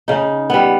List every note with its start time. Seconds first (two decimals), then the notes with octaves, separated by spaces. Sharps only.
0.08 C#3 D#4
0.50 G3 B3